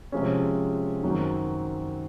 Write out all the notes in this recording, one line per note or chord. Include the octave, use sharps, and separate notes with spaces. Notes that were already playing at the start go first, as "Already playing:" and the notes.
C3 F3 G#3 C#4
F#2 D#3 F#3 C4 F#4